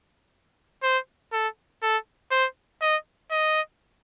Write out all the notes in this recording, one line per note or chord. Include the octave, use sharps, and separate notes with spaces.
C5
A4
A4
C5
D#5
D#5